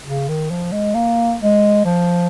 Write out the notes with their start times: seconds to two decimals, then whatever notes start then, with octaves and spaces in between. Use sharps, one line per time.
0.05 C#3
0.28 D#3
0.50 F3
0.72 G#3
0.95 A#3
1.41 G#3
1.85 F3